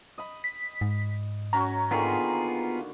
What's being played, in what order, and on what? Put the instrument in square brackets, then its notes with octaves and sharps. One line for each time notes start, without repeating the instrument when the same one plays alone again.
[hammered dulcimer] D#5 B5
[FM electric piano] B6
[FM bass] G#2
[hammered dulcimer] C#4 F#4 C#5 [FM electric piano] A#5
[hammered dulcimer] D3 D#3 A#3 [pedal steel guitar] B3 F4 G#4